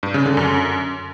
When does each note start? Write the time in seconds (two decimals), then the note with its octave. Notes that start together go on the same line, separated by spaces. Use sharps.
0.03 G2
0.14 C#3
0.26 D3
0.37 F#2